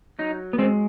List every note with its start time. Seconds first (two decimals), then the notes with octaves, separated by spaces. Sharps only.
0.19 F#3 D#4
0.53 B3
0.58 G#3 C4